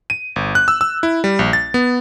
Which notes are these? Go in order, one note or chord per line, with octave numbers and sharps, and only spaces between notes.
D#7
G1
F#6
E6
E6
E4
G3
A#1
A6
B3